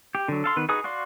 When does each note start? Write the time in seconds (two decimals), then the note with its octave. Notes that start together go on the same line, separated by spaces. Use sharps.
0.15 G4
0.28 D3 F#3
0.44 A4 F5 C6
0.57 D#3 B3 B4
0.69 D#4 F#4 G#4 B4 D#6
0.84 F#4 D5 F5 C6